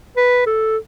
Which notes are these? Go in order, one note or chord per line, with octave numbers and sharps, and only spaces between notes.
B4
A4